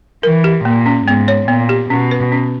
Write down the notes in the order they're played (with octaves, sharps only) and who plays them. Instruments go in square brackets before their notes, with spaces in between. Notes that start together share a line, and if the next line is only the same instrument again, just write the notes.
[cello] E3 [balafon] A#4
[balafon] G4
[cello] A#2 [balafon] A#3
[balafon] C#4
[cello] G#2 [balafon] B3
[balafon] C#5
[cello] A#2 [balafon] B3
[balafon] G4
[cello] B2 [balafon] C#4
[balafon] B4
C#4